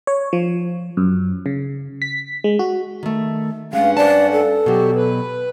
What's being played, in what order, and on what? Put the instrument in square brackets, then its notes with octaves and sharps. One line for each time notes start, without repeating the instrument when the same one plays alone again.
[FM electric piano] C#5
F3
F#2
C#3
B6
G#3
F#4
[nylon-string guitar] D#3 A3
[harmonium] G2 C#4 F#5 [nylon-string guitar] G#3 [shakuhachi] F5
[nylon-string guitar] C5 A5 [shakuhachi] D5
[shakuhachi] A4
[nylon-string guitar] B2 F#3 [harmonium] F#4 G4
[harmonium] B4